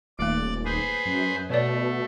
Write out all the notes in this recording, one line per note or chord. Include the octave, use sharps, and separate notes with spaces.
D#1 A3 A#3 D5 D6
G#4 B4 C5
F#2
B2 A3 C#5 D5